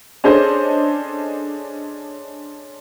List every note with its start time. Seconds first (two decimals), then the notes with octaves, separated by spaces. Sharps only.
0.24 C#4 D4 G#4 A4 C5 D#5